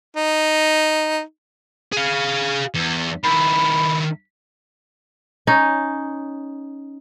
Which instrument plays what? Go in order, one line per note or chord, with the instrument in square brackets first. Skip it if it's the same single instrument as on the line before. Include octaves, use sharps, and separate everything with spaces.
[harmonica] D#4
[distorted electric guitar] G#4 F5
E2
[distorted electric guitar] D#3 E4 [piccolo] B5
[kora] C#4 D#4